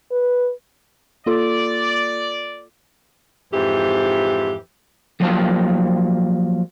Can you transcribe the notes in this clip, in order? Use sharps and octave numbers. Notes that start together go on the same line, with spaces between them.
B4
A#3 F4 A4 D5
F2 G#2 E3 G4
F3 F#3 A#3 F4 G4 A5